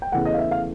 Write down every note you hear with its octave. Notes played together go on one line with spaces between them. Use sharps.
G5
E2 C#3 E3 A3 F#5
D#5
F5
E5
F5